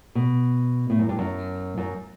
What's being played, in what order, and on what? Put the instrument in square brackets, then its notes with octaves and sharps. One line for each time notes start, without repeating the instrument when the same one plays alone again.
[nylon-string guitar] B2
A2
F#2
G2
F#2
F#2